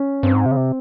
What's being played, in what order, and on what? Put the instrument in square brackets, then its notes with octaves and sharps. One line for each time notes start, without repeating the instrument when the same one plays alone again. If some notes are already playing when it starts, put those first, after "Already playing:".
Already playing: [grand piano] C#4
[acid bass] G2 [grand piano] C4
[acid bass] G#2
C3
C#3
C3